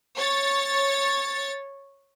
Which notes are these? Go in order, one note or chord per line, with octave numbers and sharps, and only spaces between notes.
C#5 A6